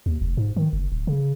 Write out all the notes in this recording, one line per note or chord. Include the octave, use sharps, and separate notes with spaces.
D#2
F1
G#2
D#3
F#1
D1
C#3